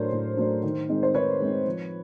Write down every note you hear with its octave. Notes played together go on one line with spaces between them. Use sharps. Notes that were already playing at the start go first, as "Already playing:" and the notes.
Already playing: A2 F#3 A3 D4 A#4 C5 C#5
A2
F#3 A3 D4
D#3
G#3 C4 D#4
C5
D#3 B4 C#5
G#3 C4 D#4
F3